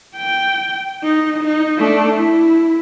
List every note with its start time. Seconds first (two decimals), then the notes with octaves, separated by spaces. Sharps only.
0.16 G5
1.03 D#4
1.44 D#4
1.78 A3 D4
2.17 E4